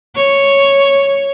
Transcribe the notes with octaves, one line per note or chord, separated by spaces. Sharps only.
C#5